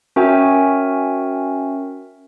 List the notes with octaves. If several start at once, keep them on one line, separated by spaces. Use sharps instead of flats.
C#4 F#4 A#4 E5 G5 G#5